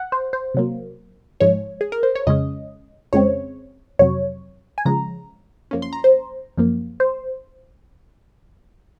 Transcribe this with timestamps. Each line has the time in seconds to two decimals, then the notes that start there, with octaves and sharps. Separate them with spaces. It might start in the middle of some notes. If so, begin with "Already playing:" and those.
Already playing: F#5
0.12 C5
0.33 C5
0.54 C3 F#3 A#3
1.40 G#2 F3 G#3 C#5
1.81 G#4
1.92 A#4
2.03 C5
2.15 C#5
2.27 F2 C#3 G#3 C#4 D#5
3.13 F2 C#3 G#3 C4 C#5
3.99 F2 C3 F#3 C#5
4.78 G#5
4.85 C#3 F3 G#3 A#5
5.71 F#2 F3 A#3 C#4
5.82 C6
5.93 A#5
6.04 C5
6.58 F#2 F3 A#3
7.00 C5